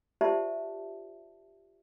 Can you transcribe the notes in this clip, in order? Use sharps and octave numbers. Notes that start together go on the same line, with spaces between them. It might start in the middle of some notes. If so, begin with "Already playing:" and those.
F4 G4 C5 D5 E5 A5